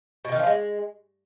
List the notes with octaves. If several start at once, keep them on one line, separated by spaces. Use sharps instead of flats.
B2
D#3
F3
G#3